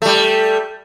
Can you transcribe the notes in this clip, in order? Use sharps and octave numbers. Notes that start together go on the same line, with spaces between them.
G3 A3